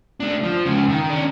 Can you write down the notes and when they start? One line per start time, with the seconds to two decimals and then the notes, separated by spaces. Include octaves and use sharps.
0.20 A3 D4
0.43 F3
0.65 C#2 C#3
0.89 D#3
1.10 C#4 D4